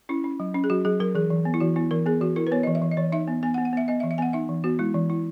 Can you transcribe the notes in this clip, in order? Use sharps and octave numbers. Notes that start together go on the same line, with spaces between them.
C#4 E4
C#4
F#3
C#4
G#4
F#3 F#4
F#3 G#4
F#3 A#4
E3 G#4
E3
B3
E4
E3 F#4
B3 E4
E3 A#4
B3 G#4
E3 F#4
E4 A#4
B4
B3 C#5
D#5
E3
E5
E3
D#5
E3 C#5
D#4 E5
B3
B3 G#5
F#5
B3
F#5
B3 E5
B3 D#5
E5
E3
E5
B3 F#5 G#5
D#4 E5
E3
B3 F#4
G#3 E4
E3
E4